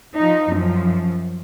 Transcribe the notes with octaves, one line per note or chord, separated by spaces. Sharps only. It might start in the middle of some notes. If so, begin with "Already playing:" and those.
F3 D#4
F#2 F3